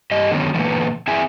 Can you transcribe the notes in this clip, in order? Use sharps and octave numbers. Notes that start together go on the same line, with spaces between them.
G2 G4 D#5
D3 D#3 F#3 B3 C#4
A#2 D3 E3 B3
C4 E4 G#4 E5 G#5